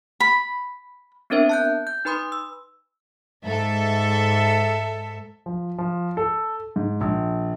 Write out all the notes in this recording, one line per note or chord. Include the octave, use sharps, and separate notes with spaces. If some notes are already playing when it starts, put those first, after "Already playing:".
B5
B3 C4 D4 A#4 C5 E5
A5 F#6 G6
G6
D#4 B4 B5 C6 D#6
E6
G#2 A4 E5
F3
F3
A4
G#2
A#1